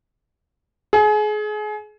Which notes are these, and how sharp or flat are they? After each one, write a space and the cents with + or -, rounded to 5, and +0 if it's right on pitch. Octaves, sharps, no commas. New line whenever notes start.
G#4 +30